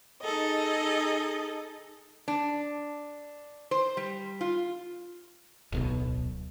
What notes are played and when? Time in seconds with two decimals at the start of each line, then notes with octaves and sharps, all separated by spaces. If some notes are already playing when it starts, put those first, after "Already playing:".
0.21 D#4 G#4 A4 D#5
2.28 D4
3.71 C5
3.97 G3
4.41 F4
5.72 D1 B1 B2